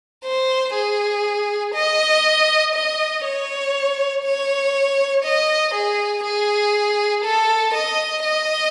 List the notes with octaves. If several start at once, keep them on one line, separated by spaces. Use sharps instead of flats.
C5
G#4
D#5
D#5
C#5
C#5
D#5
G#4
G#4
A4
D#5
D#5